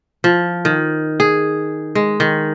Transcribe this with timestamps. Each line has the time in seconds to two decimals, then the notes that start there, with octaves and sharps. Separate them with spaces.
0.24 F3
0.65 D#3
1.20 G#4
1.95 G#3
2.20 D#3